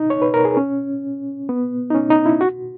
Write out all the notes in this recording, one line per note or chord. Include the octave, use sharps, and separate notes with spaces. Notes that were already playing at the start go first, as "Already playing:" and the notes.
Already playing: D#4
C#5
B4
A#4
G#4
C#4
B3
D#4
C#4
D#4
E4
F#4